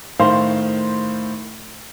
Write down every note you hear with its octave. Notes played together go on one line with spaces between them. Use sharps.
A2 D#3 C5 F5 C6